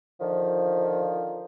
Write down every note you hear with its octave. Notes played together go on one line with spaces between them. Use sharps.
D3 D#3 F3